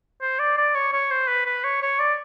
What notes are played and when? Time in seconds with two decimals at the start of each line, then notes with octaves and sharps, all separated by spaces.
0.21 C5
0.39 D5
0.57 D5
0.75 C#5
0.92 C#5
1.11 C5
1.28 B4
1.46 B4
1.64 C#5
1.82 C#5
1.99 D5